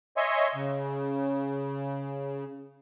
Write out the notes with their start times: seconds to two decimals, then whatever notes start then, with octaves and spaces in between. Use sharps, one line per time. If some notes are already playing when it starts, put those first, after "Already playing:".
0.17 C#5 D#5 E5 G#5 C6 C#6
0.55 C#3